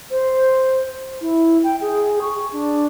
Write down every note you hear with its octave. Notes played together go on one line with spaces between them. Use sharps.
C5
E4
G5
G#4
C#6
D4